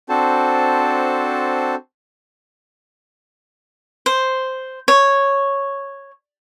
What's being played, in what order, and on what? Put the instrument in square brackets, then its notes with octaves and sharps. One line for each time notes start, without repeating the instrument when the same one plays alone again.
[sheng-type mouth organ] C4 D4 F#4 A4 C5 A5
[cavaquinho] C5
C#5